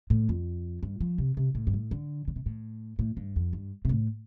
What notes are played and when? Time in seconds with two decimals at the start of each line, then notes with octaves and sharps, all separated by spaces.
0.10 A2
0.29 F2
0.83 G2
1.01 F3
1.18 C3
1.37 C3
1.55 A2
1.67 G2
1.74 A2
1.91 D3
2.28 D3
2.36 C3
2.46 A2
2.99 A2
3.17 G2
3.36 F2
3.53 G2
3.85 C3
3.89 A2